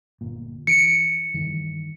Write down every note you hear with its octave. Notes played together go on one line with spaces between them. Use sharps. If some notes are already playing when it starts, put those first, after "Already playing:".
G1 A#2
E3 C#7 D7
G2 D#3 E3